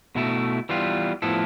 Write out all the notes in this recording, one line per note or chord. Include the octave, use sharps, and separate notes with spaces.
B2 A3 E4
E3 G3 B3 F4
A2 F3 B3 E4 A4